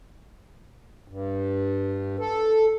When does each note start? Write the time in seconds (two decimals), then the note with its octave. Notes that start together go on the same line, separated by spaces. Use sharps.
1.08 G2
2.19 A4